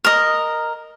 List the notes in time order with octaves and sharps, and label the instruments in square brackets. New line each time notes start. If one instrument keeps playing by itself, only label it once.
[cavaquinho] A#4 D#5